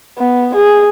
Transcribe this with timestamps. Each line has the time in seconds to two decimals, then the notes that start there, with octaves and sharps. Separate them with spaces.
0.18 B3
0.55 G#4